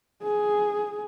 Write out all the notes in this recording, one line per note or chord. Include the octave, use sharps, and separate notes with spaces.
G#4